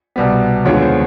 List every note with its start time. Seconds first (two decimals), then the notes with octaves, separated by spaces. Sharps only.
0.16 C2 B2 G3 B3
0.65 D#2 D3 F3 G#3 B3 C#5
0.82 C5